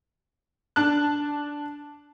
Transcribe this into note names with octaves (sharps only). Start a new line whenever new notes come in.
D4 A5 F#6